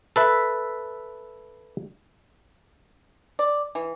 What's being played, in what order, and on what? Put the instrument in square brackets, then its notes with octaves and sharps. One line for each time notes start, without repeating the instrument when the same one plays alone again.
[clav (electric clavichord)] A4 B4 E5
[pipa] D5
E3